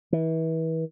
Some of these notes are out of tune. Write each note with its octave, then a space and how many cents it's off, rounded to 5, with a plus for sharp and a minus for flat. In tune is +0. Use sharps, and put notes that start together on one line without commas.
E3 -30